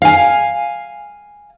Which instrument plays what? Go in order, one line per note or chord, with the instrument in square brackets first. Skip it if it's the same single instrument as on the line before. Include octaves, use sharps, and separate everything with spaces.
[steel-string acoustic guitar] F5 G#5